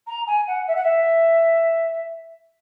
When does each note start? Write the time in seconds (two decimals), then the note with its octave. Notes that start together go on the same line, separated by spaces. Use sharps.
0.07 A#5
0.27 G#5
0.47 F#5
0.67 E5
0.75 F#5
0.83 E5